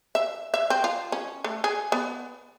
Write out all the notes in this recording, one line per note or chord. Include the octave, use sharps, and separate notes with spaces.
E5
E5
C4
F4
C#4
A3
G#4
B3